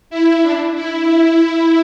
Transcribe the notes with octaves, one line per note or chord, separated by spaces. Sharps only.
E4
D4
E4
E4